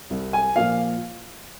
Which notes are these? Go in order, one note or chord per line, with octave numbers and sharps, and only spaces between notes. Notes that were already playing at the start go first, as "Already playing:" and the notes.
C2
G#5
A#2 F3 F5